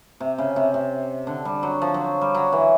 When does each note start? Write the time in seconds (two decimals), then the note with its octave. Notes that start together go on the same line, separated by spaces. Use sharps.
0.20 C3
0.38 C#3
0.56 C3
0.74 C3
1.27 D3
1.45 G3
1.63 F#3
1.82 F3
1.94 F#3
2.21 G3
2.35 F#3
2.52 E3